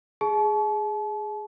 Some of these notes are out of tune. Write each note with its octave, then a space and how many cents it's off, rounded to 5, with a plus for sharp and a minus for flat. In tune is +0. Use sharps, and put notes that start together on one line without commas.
G#4 +0 A5 -40